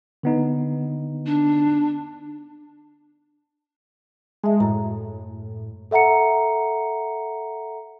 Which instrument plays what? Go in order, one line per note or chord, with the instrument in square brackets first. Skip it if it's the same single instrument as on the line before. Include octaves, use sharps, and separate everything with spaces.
[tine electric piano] D3 B3 D#4
[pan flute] D4
[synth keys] G#3 [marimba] E5 A5
[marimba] F#2 A#5 [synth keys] A2
[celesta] A4 E5 F#5 A#5 C#7